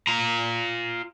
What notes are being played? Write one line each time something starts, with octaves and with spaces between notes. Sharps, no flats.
F4 A#5